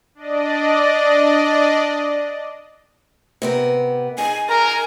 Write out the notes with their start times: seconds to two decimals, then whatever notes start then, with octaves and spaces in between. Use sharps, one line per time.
0.15 D4 D5 D#5
3.42 C3 B3 A#4
4.18 D#4 G#4 G#5
4.49 A#4 G#5 A#5